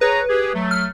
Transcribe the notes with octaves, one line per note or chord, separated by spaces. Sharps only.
G#4 B4 C#5 A#5
G4 G#4
F#3 A3
F6